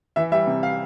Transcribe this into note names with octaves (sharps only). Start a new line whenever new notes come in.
E3 E5
G3 E5
C3
F5